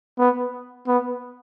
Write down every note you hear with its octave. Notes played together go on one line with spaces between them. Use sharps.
B3
B3